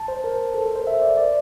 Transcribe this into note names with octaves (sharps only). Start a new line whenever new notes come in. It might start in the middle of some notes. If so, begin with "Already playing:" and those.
Already playing: A5
C5
A#4
A4
A#4
C5
E5
D5
D5